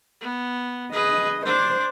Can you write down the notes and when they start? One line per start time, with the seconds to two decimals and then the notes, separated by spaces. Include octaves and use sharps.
0.21 B3
0.93 G#4 B4 D#5
1.45 D4 C5 D6